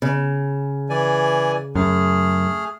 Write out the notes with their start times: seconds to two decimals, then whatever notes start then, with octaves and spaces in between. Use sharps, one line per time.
0.02 C#3
0.90 E3 D5 G#5
1.75 F#2 A3 G#4 F6